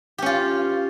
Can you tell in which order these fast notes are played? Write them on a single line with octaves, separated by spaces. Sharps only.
G4 C#4 F4